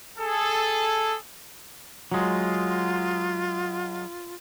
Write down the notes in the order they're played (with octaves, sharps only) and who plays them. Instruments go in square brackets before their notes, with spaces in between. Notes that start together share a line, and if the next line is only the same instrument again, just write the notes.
[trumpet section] G#4 A4
[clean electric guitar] F#3 G#3 [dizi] F4